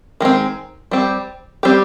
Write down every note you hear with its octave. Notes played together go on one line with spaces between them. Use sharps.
D#3 G#3 C4
G3 C4 G4
G3 C4 G4